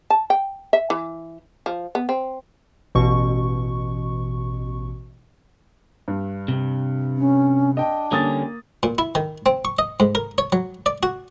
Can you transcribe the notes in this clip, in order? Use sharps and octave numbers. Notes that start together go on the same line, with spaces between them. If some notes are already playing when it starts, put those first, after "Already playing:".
A5
G5
E5
E3
F3
B3
C4
A1 B2 C#6
G2
C3
C#4
D4 D#5 G5
D3 G3 A#3 C#4 D#6 A6
A#2
E4
D#3
C4
C#6
D#5
G#2
A#4
C#5
F#3
D5
F#4